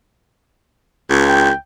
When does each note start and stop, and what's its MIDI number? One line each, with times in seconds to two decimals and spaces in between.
1.10 1.50 37
1.29 1.55 79